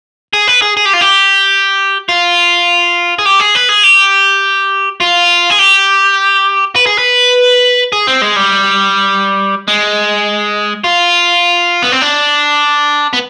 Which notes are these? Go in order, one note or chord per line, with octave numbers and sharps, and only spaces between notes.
G#4
B4
G#4
G#4
G4
F4
G4
F4
G#4
G4
G#4
B4
G#4
G4
F4
G#4
G4
B4
G#4
B4
G#4
C4
G#3
G3
G#3
F4
B3
C4
D4
B3